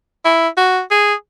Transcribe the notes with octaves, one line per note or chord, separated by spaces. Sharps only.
E4
F#4
G#4